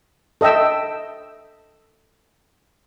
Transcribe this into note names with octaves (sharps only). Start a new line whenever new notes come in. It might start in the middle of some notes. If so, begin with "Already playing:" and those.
A4 D#5 E5 G5 E6